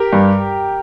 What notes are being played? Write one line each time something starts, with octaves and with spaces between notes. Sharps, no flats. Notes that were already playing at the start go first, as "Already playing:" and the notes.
Already playing: G4 A#4
G2